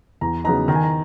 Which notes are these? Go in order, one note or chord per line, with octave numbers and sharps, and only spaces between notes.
E2 A#5
C#3 F#3 B3 D#4 A#5
D#3 A#5
G#5
A#5